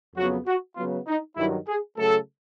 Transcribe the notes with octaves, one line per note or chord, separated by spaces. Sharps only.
F2 C#3 F#3 B3 F#4
F#4
C#3 F#3 B3 F4
D#4
G2 D#3 F#3 E4
G#4
C#3 F#3 A3 A4